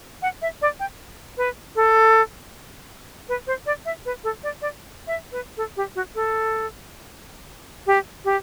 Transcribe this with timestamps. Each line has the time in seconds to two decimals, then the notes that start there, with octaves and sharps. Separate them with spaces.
0.22 F#5
0.42 E5
0.62 D5
0.80 G5
1.37 B4
1.76 A4
3.29 B4
3.47 C5
3.66 D5
3.85 E5
4.06 B4
4.24 A4
4.43 D5
4.62 D5
5.07 E5
5.32 B4
5.57 A4
5.77 G4
5.95 F#4
6.15 A4
7.87 G4
8.25 G4